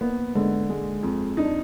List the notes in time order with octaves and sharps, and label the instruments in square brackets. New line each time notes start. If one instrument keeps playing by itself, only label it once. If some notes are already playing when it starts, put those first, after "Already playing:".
[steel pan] A#3 [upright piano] B3
[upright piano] D3 [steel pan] G#3
[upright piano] G#3
F2
[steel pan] D4 [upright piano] D#4